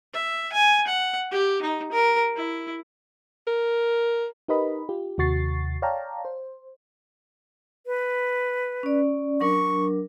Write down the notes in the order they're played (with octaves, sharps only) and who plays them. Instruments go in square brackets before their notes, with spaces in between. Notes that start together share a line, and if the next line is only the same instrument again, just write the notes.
[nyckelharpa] E5
G#5
F#5
G4
D#4
A#4
E4
[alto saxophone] A#4
[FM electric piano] D#4 G4 A#4 B4 D#5 B5
F4 G4
D#2 C3 F#4 C#6 A6 C7
C#5 D5 F5 G5 A5 A#5
C5
[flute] B4
[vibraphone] C#4 D5
[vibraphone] F#3 D4 A#4 [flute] C#6